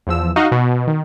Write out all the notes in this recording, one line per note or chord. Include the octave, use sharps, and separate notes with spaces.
E2 F3 E6
D#4 F#4 D#5 F5
B2
D#3